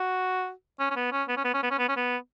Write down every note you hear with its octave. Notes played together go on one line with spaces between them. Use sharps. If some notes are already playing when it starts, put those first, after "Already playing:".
Already playing: F#4
C#4
C#4
B3
C#4
B3
C#4
B3
C#4
B3
C#4
B3
C#4
B3